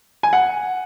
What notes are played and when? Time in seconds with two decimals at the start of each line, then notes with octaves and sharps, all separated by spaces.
0.23 G#5
0.33 F#5